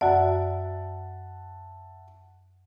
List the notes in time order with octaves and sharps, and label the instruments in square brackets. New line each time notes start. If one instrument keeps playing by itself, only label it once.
[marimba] F#2 F#4 D5 [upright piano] E5 F#5 A5